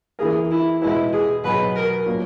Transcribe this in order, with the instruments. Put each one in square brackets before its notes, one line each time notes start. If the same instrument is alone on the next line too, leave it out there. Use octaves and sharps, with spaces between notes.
[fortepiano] E3 A#3 E4 A#4 [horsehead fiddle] G#4
[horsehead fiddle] E4
[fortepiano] B2 G#3 D#4 G#4 B4 [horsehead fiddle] E4
[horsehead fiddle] G#4
[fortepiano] B2 F#3 B3 D#4 G#4 [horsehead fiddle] B4
[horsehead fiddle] A#4
[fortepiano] A#2 F#3 A#3